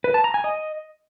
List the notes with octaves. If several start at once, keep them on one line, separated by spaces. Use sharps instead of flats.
B4
A5
A#5
G#5
D#5